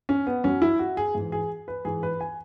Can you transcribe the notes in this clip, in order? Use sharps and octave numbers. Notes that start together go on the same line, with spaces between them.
C#4
B3
F#2 F#3 C#4
E4
F#4
G#4
G#2 E3
G#4
B4
G#2 E3 G#4
B4
G#5